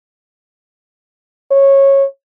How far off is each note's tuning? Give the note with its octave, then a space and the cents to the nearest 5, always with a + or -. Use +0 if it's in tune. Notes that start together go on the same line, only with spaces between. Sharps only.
C#5 -15